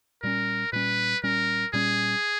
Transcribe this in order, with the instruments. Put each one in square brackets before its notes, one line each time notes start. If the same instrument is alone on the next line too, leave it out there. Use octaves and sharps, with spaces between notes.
[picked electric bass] A#2 G3 C#4 [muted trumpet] A#4
[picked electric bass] A#2 G3 C#4 [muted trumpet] B4
[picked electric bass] A#2 G3 C#4 [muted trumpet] A#4
[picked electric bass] A#2 G3 C#4 [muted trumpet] G#4